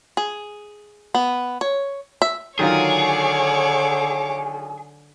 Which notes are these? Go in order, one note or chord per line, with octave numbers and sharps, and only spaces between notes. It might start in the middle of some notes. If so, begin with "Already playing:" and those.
G#4
B3
C#5
E5
D3 D#3 F#3 F4 G#4 C#5 D6